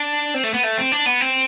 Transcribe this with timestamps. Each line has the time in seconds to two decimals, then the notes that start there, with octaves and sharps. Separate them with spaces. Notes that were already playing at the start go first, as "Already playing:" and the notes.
Already playing: D4
0.34 C4
0.44 A3
0.54 B3
0.63 A3
0.78 C4
0.92 D4
1.06 B3
1.21 C4